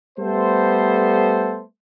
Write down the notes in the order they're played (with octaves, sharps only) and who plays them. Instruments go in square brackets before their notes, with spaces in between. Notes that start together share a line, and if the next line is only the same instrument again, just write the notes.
[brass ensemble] G3 A3 B3 A4 C5